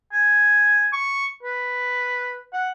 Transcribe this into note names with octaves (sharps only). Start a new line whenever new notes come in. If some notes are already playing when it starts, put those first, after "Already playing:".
G#5
C#6
B4
F#5